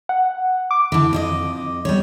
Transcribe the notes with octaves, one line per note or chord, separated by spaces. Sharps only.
F#5
D6
D3 E3
F2 F4 D#5
G3 B3 C#5